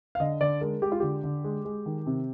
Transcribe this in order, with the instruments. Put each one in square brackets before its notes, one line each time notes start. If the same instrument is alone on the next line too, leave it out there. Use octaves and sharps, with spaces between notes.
[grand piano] F5
D3 D#5
D3 D5
G#3 A#4
G#3 G4
F4
D3 G4
D3
G#3
G#3
D#3
C3